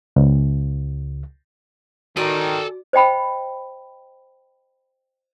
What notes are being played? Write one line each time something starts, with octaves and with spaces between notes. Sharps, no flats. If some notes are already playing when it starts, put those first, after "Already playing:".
C#2
D#3 F#4 A4 D5 G#5
C5 D#5 G5 B5